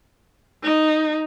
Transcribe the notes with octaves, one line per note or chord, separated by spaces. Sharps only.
D#4